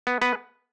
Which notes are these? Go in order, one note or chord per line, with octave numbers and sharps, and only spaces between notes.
B3
B3 B4